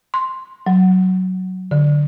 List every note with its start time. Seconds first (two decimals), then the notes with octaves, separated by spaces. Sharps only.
0.14 C6
0.66 F#3
1.71 D3